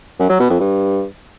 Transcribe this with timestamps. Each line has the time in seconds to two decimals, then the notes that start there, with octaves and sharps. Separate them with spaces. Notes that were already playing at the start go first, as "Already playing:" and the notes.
0.20 F#2
0.30 F#3
0.40 B2
0.50 F2
0.60 G2